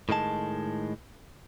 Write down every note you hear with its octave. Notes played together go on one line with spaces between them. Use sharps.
A2 D#3 G#3 A5